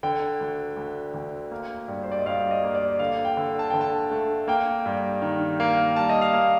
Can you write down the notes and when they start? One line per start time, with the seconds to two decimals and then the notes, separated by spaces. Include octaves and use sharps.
0.03 D3 G5
0.40 D2
0.77 D2
1.14 D2
1.51 A#3
1.88 G2
2.03 C5
2.12 D5
2.19 D#5
2.26 G2 F5
2.51 D#5
2.63 A#3
2.75 D5
2.99 D3 F5
3.25 G5
3.37 D3
3.59 A5
3.70 D3 G5
3.81 A5
4.11 A3
4.48 A#3 G5
4.86 G2
5.22 D#3
5.60 A#3
5.96 G3 A5
6.09 D#5
6.21 F5
6.33 A#3